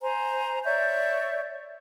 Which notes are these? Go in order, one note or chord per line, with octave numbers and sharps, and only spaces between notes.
C5 G#5 A#5
C#5 D5 E5 G6